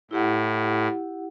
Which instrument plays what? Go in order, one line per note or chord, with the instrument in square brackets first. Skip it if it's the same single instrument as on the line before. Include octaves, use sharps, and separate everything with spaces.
[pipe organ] A2 [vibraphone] E4 G4 F#5